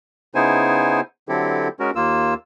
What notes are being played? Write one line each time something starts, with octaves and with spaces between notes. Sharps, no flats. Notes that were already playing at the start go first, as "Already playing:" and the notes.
C#3 B3 D#4 E4 C5 G#5
D3 F#3 C4 E4 G4 A4
G#3 C#4 F#4 A#4
D#2 A#3 F4 E6